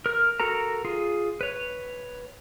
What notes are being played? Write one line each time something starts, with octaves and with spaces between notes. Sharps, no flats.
A#4 F6
F#4 A4 A#4 A#5
F4 G#4
B4 C#5